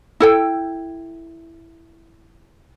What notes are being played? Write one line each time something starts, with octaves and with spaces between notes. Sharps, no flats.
E4 A4 G5